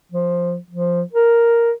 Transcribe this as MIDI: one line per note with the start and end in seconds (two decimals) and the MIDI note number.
0.12 0.57 53
0.70 1.02 53
1.13 1.71 70